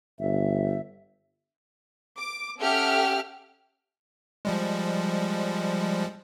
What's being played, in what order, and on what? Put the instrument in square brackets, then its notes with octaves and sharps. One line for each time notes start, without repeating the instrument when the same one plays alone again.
[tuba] G1 [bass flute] E5
[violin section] D6
C#4 G4 A4 E5 F#5 F6
[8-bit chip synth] F3 G3 G#3